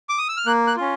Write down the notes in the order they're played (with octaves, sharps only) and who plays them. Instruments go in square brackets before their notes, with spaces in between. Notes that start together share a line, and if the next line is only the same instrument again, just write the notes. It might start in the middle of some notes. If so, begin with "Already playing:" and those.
[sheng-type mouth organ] D6
D#6
E6
F6
A#3 F#6
F#6
C#4 F4